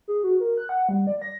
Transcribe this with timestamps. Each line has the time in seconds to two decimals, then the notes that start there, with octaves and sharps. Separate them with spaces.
0.08 G#4
0.23 F#4
0.40 A#4
0.57 F#6
0.69 F#5
0.89 G3
1.07 D5
1.22 A#6